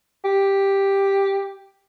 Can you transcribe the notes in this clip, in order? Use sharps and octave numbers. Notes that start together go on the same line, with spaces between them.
G4